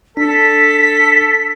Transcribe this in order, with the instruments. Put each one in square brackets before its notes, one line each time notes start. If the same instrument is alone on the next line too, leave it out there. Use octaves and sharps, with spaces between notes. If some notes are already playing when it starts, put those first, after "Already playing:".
[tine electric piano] D4 [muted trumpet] A4 [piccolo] B6